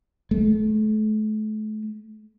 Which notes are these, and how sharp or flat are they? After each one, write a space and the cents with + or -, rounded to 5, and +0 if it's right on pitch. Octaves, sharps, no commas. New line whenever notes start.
A3 -35